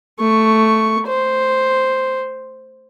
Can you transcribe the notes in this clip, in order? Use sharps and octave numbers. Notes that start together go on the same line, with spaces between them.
A3 C#6
C5